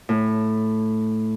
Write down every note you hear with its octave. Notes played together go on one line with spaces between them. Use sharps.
A2